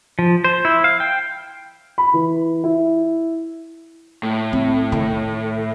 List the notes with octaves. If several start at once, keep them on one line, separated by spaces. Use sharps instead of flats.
F3
C5
E4
F5
G5
B5
E3
E4
A2
C4
D#3